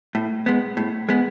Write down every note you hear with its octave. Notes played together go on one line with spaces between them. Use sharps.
A2
G#3 B3
A2
G#3 B3